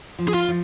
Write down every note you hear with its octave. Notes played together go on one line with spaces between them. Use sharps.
F3
G#4
F4
F3